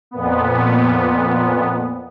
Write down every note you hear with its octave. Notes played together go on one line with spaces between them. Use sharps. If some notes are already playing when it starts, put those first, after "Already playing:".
F2 A#2 B3